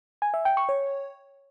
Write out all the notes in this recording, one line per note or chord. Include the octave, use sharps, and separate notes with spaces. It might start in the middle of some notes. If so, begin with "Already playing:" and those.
G#5
E5
G5
C#6
C#5